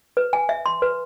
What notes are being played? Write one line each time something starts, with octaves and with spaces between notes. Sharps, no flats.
B4
G#5
E5
C6
B4